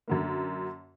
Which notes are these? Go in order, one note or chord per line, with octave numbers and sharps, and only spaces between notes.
F#2 D3 A#3